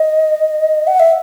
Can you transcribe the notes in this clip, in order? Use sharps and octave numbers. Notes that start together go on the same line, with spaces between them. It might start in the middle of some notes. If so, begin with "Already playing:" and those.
Already playing: D#5
F#5
E5